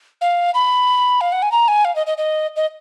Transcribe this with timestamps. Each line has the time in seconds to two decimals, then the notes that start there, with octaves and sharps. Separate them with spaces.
0.21 F5
0.54 B5
1.21 F5
1.32 F#5
1.42 G#5
1.52 A#5
1.68 G#5
1.85 F5
1.96 D#5
2.07 D#5
2.18 D#5
2.56 D#5